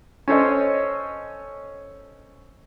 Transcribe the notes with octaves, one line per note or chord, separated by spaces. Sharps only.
C#4 A4 C5 C#5 D#5